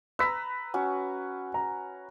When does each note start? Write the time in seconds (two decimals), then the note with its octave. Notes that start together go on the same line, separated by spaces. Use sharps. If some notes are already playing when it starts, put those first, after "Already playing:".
0.19 B4 A#5 E6 B6
0.74 C#4 F#4
1.54 A#5